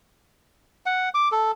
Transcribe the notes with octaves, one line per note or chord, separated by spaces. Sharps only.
F#5
D6
A4